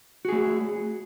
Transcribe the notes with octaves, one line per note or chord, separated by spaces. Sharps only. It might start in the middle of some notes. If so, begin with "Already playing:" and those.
A3 F#4 G#4